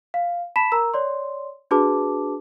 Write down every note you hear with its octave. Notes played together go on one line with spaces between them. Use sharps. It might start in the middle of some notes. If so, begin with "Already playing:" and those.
F5
A5 B5 B6 E7
A#4 A#5 E6
C#5 D5 C6
D4 F#4 G#4 B4 A5 D6